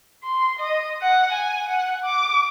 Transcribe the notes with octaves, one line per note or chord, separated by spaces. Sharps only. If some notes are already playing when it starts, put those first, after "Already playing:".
C6
D#5
F#5
G#5
F#5
D6